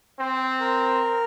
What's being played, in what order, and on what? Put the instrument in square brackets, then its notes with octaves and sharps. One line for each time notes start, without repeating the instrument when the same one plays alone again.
[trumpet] C4 [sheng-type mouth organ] C5
[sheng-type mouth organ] A#4